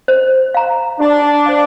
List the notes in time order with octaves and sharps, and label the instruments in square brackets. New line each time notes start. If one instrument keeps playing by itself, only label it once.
[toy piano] C5
F5 A#5
[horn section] D4 [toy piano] G4
[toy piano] C5 F5